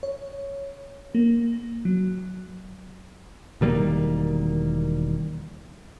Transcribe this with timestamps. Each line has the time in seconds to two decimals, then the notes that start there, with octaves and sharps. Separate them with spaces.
0.03 C#5
1.15 A#3
1.85 F#3
3.61 E1 D#3 G3 A#3